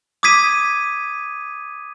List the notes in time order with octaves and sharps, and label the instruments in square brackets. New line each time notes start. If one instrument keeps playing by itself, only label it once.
[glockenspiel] D6 D#6 G#6 B6 D#7